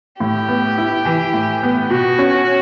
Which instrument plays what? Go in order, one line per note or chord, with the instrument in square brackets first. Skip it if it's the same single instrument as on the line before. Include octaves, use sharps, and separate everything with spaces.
[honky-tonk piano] A2 [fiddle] G4
[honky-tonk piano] B3
E4
E3
A2
B3
[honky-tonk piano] B2 [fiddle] F#4
[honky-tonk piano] C#4